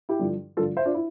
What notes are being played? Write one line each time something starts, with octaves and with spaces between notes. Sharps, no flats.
E4 G4
G2 D3 F3
G2 D3 F3 F4 A4
C5 E5
D4 F4
E4